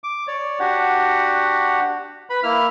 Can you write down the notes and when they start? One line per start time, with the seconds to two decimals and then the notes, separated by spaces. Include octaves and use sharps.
0.04 D6
0.27 C#5 D5
0.59 D4 F#4 G4 F#5
2.30 B4 B5
2.43 A#3 E4 F6